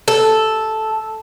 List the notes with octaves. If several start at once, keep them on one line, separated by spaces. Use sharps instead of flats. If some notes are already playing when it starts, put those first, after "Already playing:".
A4